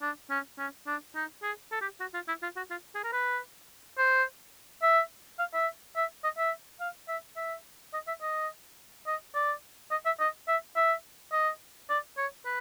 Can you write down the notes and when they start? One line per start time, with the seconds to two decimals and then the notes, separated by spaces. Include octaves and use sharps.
0.02 D4
0.30 C#4
0.58 C#4
0.87 D4
1.15 D#4
1.43 G#4
1.72 A4
1.81 G4
2.00 F#4
2.14 F4
2.28 E4
2.42 F4
2.56 F#4
2.71 F4
2.95 G#4
3.04 A#4
3.12 B4
3.98 C5
4.83 E5
5.39 F5
5.54 E5
5.96 E5
6.24 D#5
6.38 E5
6.80 F5
7.08 E5
7.36 E5
7.93 D#5
8.07 E5
8.22 D#5
9.07 D#5
9.35 D5
9.91 D#5
10.06 E5
10.19 D#5
10.48 E5
10.76 E5
11.32 D#5
11.89 D5
12.17 C#5
12.45 B4